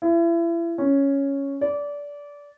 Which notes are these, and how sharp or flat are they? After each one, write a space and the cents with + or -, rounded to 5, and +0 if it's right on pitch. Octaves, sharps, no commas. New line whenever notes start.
E4 +35
C#4 +0
D5 -20